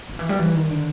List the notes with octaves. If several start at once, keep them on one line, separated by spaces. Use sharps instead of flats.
D#3
E3
G3
E3
D#3
D3